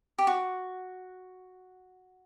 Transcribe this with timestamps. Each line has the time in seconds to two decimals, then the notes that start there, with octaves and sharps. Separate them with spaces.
0.19 G4
0.27 F#4